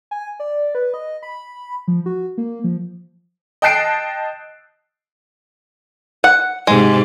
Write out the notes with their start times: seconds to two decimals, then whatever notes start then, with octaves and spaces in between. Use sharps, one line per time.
0.11 G#5
0.40 D5
0.75 B4
0.94 D#5
1.23 B5
1.88 F3
2.06 F#4
2.38 A#3
2.64 F3
3.62 D#5 G5 A5 F#6 C7 D7
6.24 F#5
6.67 G#2 C3 G#3